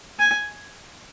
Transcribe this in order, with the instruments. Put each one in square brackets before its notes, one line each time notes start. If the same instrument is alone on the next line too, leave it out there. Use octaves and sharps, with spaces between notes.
[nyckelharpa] G#5